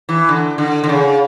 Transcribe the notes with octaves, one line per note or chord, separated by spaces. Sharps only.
E3
D3
D3
D3
C#3